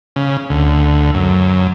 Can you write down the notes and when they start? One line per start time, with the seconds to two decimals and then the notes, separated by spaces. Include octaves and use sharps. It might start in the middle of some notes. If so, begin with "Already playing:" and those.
0.16 C#3
0.50 D2
1.14 F#2